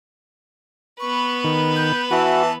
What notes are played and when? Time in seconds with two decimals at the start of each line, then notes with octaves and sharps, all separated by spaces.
1.00 B3 B4 C#6
1.44 D#3
1.76 G6
2.11 E3 F#4 A5